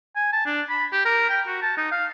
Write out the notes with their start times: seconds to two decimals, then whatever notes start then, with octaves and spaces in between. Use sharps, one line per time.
0.16 G#5
0.32 A5
0.46 D4
0.69 B5
0.92 G4
1.05 A#4
1.29 G5
1.47 F#4
1.62 A5
1.77 D#4
1.92 F5